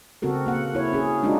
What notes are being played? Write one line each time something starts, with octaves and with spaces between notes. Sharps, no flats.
C#3 C4 F#4 A4 A#4
A#3 F#5
E4 C#5
C#4 G#4
G#3 D4 D#4 F4 F#4